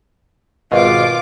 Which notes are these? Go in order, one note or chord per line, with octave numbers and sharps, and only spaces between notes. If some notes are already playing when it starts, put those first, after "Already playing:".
G#1 B2 F4 D6